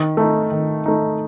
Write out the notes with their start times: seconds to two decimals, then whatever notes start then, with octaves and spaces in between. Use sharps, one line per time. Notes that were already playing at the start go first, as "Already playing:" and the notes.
Already playing: D#3
0.17 A3 D#4
0.52 D#3
0.86 A3 D#4